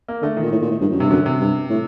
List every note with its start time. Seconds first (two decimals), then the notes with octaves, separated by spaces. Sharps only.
0.08 A#3
0.22 D3 A3
0.37 D#3
0.42 A#2
0.52 A2
0.62 A#2
0.71 A2
0.81 G2
0.92 F#2
1.00 G2 C3
1.11 F#2 D3
1.26 C3
1.40 G2
1.70 A2